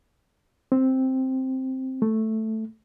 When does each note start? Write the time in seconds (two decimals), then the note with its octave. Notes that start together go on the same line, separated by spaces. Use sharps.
0.72 C4
2.02 A3